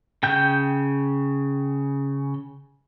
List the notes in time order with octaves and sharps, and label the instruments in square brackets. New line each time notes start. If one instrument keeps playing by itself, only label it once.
[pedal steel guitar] C#3 G5 G6